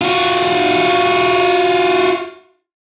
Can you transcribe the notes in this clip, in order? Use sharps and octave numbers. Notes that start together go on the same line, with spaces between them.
F4 F#4